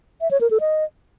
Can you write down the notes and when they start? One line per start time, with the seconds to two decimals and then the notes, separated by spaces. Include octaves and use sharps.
0.21 E5
0.31 C#5
0.41 A#4
0.51 A4
0.60 D#5